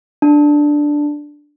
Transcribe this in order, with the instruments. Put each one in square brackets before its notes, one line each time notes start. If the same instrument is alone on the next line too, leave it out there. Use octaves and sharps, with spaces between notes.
[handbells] D4